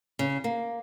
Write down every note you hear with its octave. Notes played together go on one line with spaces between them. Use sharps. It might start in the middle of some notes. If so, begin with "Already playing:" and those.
C#3
A#3